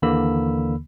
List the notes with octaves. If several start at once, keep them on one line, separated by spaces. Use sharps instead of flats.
D#2 D3 E3 A#3 B5 E6